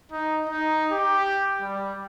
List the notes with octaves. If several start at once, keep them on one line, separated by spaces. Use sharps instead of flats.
D#4
D#4
G4
G3